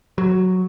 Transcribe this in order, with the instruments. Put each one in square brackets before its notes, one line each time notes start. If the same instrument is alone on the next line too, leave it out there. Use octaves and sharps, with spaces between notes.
[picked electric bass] F#3